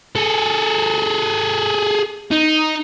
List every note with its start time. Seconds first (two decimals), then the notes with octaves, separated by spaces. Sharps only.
0.16 G#4 A4
2.31 D#4